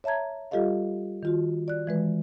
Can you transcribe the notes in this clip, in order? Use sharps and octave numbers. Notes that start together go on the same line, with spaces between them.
C#5 E5 A5 A#5 G#6
G3 F4 G4 A4 D#5 F5
D#3 F4 F#4
D5 F#6
E3 G#3 B4